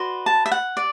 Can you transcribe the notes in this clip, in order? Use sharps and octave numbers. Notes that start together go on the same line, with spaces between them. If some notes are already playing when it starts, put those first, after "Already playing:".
Already playing: F#4 B4 D5 C6
A5
E5
F#5
D5